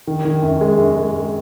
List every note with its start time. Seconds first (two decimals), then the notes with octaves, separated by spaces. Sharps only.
0.07 D#3
0.25 D#3
0.42 F#2
0.61 G#3
0.78 F#2
0.96 G#3
1.14 G#3